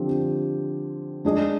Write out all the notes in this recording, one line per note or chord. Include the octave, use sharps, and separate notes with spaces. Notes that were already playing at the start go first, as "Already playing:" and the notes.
Already playing: D3 F3 C4 G4
G#3 D4 G#4 D#5